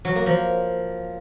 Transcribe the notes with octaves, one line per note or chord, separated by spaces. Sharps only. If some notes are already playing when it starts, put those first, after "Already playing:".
F#3
A#3
F3